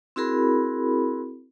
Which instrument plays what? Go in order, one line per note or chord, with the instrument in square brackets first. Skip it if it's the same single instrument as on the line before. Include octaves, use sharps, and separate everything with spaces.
[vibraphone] C4 E4 F#4 G#4 A#4 B5